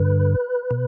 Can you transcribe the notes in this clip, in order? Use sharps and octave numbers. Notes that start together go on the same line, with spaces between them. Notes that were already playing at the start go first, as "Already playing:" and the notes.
Already playing: G2 D3 B4
B2